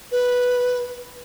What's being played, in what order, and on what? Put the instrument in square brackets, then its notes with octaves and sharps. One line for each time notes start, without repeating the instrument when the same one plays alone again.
[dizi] B4